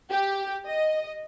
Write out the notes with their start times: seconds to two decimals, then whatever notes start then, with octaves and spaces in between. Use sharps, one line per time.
0.10 G4
0.66 D#5